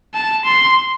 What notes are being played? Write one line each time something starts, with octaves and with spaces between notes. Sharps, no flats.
A5
C6